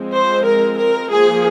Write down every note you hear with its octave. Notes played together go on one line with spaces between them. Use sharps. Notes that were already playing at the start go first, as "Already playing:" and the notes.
Already playing: F3 G#3 C4
C5
A#4
A#4
F3 A#3 G#4